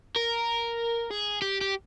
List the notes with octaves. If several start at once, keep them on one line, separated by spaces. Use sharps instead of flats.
A#4
G#4
G4
G4